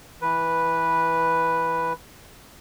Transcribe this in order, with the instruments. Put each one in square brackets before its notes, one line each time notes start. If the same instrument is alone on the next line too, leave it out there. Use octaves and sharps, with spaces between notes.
[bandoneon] E3 B4